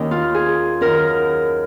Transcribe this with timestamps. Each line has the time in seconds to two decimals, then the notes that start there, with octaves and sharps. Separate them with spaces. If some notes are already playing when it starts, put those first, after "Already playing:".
Already playing: D#2 D#3 C#4 D#4
0.11 F4
0.35 G#4
0.81 F#2 D#3 A#4